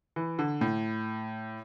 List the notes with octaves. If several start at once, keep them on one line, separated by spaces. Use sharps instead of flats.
E3
D3
A2